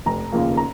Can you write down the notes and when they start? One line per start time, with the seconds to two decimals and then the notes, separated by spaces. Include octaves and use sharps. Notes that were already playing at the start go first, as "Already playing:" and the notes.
0.06 F1 A#5
0.32 D#2 C#3 F3 A#3
0.57 A#5